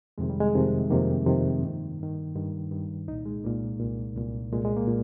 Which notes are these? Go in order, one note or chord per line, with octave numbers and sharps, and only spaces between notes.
F2 C3 D#3 G#3
G3
G#3
F2 C3 D#3
F2 C3 D#3 A#3
F2 C3 D#3
G2 D#3
G2 D#3
G2 D#3
G2 D#3
C2 A#2 D#4
G#3
C2 A#2 A#3
C2 A#2
C2 A#2
C2 A#2 G#3
G#3
A#3
A#2